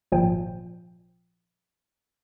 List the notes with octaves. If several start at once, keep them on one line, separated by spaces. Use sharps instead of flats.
G#1 A#2 F3 G5